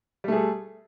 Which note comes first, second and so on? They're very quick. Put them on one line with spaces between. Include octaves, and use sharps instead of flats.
G3 A3 G#4 A4